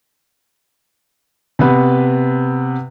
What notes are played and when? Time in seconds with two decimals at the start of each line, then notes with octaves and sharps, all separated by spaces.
1.59 C3 B3 B4